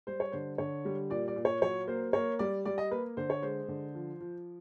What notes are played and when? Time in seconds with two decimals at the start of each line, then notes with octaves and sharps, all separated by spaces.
0.07 G3 C5
0.20 C#5
0.32 D3 C5
0.58 D3 C#5
0.85 G3
1.10 A#2 D5
1.28 D5
1.36 A#2
1.45 C#5
1.62 F#3 C#5
1.87 A#3 C5
2.13 A#3 C#5
2.39 G3 D5
2.65 G3 D5
2.78 D#5
2.91 A#3 B4
3.17 D3 C5
3.30 C#5
3.42 G#3 C5
3.68 D3
3.95 F3
4.20 F3